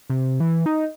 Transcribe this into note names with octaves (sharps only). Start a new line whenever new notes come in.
C3
E3
D#4